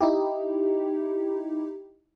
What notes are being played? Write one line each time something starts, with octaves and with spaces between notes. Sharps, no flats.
D#4 E4 G4